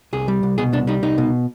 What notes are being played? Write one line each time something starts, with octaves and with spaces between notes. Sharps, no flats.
C2 G#4
G3
C2
B2 G#4
C2 D4
G3 D#4
C2 D#4
B2